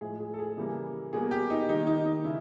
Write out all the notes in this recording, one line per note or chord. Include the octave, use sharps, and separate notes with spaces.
A2 F3 G#3 G#4
G#4
A4
G#4
C#3 E3 G3 A#3
B2 G3 A#3 G#4
G4
D#4
D#3 G3 A#3 D#4
D#4
D#4
C#3 E4